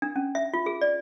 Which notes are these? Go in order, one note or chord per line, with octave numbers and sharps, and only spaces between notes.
D4
C#4
E5
F4
G#4
D5